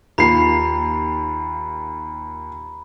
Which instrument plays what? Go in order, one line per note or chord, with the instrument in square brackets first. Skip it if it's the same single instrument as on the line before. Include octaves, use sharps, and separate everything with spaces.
[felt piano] D#2 F4 C7 [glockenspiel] A#5 B5